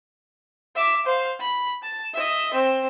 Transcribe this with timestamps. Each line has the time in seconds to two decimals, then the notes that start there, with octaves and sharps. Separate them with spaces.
0.75 E5 D6
1.05 C5 F5
1.40 B5
1.83 A5
2.14 D#5 E5
2.53 C4